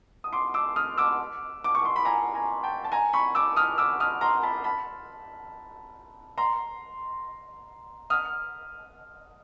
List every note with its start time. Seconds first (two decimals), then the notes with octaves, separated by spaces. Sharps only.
0.24 D#6
0.33 C6 D6
0.54 D6 E6
0.76 D#6 F6
0.98 D6 E6
1.64 D6
1.75 C#6
1.85 C6
1.96 B5
2.05 G#5 A#5
2.34 G#5 A#5
2.63 G5 A5
2.84 A5
2.92 G#5 A#5
3.13 B5 C#6
3.35 D6 E6
3.56 D#6 F6
3.78 D6 E6
4.00 D#6 F6
4.21 A#5 C6
4.43 A5 B5
4.64 A5 B5
6.38 A#5 C6
8.10 D#6 F6